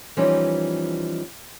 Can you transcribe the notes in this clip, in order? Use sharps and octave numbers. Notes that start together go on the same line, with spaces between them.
E3 F3 G3 C#4 D#4 B4